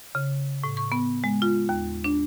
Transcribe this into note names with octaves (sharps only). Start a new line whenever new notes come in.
C#3
A2
C#6
B3
G#3
F4
D#2
D4